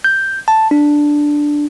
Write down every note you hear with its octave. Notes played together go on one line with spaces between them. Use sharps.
G6
A5
D4